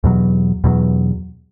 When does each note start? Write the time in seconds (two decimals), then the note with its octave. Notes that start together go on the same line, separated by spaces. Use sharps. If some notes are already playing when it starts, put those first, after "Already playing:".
0.04 E2 B2 F#3
0.64 E2 B2 F#3